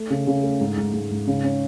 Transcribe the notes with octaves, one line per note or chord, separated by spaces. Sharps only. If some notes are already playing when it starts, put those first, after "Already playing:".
Already playing: A3
C#3
C#3
A3
G#2
G#2
G#2
G#2
C#3
C#4